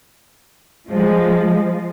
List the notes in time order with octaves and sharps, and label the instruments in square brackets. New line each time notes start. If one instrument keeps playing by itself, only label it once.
[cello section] F3 G#3